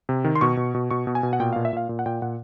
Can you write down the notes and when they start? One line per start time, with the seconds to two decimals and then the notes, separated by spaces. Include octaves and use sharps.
0.09 C3
0.24 D#3
0.35 C6
0.41 B2 C#6
0.57 B2
0.74 B2
0.91 B2 C#6
1.07 B2
1.15 G#5
1.23 B2
1.33 F#5
1.40 A#2 G5
1.53 A#2 F5
1.65 E5
1.73 A#2 F5
1.89 A#2
1.99 F#5
2.06 A#2 G5
2.22 A#2 F#5